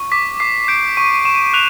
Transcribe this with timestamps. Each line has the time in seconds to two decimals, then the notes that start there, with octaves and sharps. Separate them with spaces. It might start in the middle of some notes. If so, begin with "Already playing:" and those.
Already playing: C#6
0.12 D6 B6
0.40 D6 C7
0.68 G6 D7
0.97 C#6 D#7
1.25 C#6 E7
1.54 F#6 F7